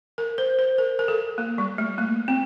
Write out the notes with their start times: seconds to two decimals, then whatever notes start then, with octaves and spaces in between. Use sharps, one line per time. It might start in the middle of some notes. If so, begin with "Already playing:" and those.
0.18 A#4
0.38 C5
0.59 C5
0.78 A#4
0.99 A#4
1.08 A4
1.38 A#3
1.58 G3
1.78 A3
1.98 A#3
2.28 C4